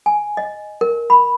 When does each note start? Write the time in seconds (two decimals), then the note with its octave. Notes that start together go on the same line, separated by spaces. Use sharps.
0.06 G#5
0.37 D#5
0.81 A#4
1.10 B5